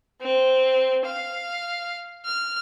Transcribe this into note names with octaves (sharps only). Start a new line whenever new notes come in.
C4
F5
F6